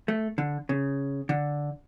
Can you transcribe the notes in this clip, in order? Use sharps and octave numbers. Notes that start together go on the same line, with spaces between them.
A3
D3
C#3
D3